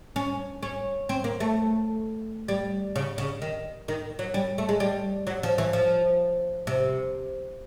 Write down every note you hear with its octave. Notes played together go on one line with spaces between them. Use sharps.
C#4
C#4
C4
A#3
A3
G3
C#3
C#3
D#3
D#3
F#3
G3
A3
G#3
G3
F#3
F3
E3
F3
C3